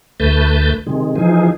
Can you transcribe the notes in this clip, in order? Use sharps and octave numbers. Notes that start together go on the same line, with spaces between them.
D2 A3 B4 A5 G6
C3 D#3 G#3
E3 F3 D#4 G#4